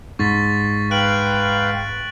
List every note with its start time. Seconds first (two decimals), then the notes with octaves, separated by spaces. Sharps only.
0.19 G#2 C#6 A6 B6
0.91 B4 F5 G5 F#6 D7 F#7